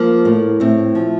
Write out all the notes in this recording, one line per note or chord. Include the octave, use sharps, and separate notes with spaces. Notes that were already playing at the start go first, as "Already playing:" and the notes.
Already playing: F3 A#3
A2
A2 C4
F3